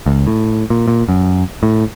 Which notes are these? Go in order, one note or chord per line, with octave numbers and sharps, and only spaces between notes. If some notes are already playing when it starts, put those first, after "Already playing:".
C#2
A2
A#2
A#2
F#2
A2